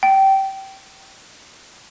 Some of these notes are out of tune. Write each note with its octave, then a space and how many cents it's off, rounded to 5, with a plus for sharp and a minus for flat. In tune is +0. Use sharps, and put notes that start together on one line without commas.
G5 -20